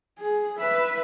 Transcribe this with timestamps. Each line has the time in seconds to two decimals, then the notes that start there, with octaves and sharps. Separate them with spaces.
0.19 G#4
0.59 B4 E5